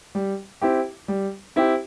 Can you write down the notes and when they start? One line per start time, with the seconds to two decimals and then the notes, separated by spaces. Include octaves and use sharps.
0.15 G3
0.62 C4 E4 G4
1.08 G3
1.56 C4 E4 G4